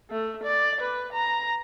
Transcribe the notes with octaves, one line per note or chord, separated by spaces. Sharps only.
A3
D5
B4
A#5